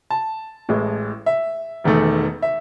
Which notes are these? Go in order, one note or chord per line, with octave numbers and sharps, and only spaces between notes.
A5
A1 A2 G#3
E5
E1 E2 D#3 A3
E5